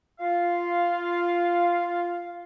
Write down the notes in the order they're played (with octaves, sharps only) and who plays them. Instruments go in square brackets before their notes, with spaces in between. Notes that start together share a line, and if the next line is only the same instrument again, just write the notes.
[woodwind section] F4 F5